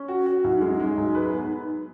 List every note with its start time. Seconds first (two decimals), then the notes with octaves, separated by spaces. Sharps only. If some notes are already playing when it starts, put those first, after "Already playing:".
Already playing: C#4
0.08 F#4
0.26 F#4
0.44 F#2 E4
0.53 D#4
0.61 G#3 C#4
0.72 D#4
0.80 G#3
0.98 F#2
1.15 B4
1.33 B3